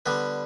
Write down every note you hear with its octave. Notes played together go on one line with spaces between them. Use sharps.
D3 G3 B3 B4